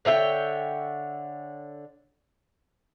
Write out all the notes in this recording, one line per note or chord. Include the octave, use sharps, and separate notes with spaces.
D3 C#5 E5 G5